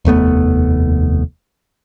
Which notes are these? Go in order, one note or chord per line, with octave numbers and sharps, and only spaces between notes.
F1 D#2 A3 B3